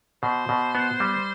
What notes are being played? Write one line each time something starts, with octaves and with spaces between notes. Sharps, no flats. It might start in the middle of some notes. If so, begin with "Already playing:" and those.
B2 C5
B2
B3
G3